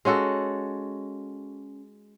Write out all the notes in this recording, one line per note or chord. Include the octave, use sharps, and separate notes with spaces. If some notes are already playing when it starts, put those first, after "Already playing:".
G#3 C#4 F#4 A4